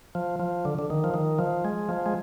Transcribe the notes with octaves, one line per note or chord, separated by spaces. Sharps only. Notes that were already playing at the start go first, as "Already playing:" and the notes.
F3
F3
D3
D3
D#3
F3
D#3
F3
G#3
F3
G#3